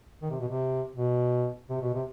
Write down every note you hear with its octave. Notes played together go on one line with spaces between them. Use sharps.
D#3
C3
B2
C3
B2
C3
B2
C3